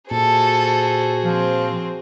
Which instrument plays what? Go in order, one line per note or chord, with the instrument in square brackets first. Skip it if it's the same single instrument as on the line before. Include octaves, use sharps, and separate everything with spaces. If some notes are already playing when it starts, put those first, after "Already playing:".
[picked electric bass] A#2 [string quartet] F#4 G#4 C5 [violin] A4
[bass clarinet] F3 [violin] C4